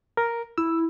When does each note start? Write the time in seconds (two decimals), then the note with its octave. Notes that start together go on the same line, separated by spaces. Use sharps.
0.17 A#4
0.58 E4 E6